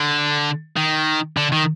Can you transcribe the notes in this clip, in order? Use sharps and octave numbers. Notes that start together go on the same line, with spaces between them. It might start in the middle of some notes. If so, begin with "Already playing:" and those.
Already playing: D3
D#3
D3
D#3